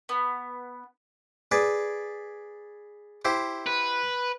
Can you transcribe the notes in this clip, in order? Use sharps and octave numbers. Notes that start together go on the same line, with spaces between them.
B3
G#4 B4 D5
E4 G4 C5
B4